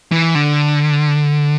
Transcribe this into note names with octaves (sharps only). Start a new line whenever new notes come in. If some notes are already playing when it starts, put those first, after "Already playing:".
E3
D3